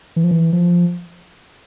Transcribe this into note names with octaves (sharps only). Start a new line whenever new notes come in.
E3
F3
E3
F3